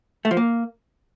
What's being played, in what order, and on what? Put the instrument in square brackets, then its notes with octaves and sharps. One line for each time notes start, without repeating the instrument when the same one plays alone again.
[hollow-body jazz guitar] A3
F3
A#3